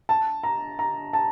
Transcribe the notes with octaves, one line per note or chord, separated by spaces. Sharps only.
A5
A#5
A#5
A5